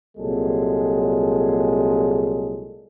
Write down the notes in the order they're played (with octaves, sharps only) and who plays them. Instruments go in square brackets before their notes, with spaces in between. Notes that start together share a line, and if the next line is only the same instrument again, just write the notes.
[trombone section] C2 A#2 F#3 G#3 A4